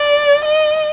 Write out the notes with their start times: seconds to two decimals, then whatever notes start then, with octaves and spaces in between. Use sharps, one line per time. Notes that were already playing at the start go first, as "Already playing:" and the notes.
Already playing: D5
0.45 D#5